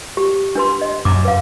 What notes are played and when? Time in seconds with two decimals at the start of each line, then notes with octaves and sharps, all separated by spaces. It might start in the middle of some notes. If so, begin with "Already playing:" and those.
0.17 G4
0.55 D4 B4 C6
0.82 D#5
1.05 F#2 A#5 D6
1.25 B4 F5